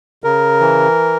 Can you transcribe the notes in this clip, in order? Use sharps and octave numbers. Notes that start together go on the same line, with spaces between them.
C#3 A#4
E3